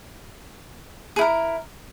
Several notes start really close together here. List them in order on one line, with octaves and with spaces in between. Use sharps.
G#4 E4 A#4